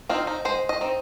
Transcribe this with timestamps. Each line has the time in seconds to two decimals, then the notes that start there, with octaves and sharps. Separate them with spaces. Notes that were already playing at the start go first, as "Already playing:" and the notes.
0.09 C4 D#4 F4
0.27 D#4
0.45 G#3 C5
0.69 D#5
0.81 C4 D#4